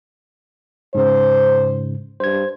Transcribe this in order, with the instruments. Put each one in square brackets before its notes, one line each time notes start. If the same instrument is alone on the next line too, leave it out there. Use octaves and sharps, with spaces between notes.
[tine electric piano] G#2 C#3 [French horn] C5
[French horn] G2 [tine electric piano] C5 G#6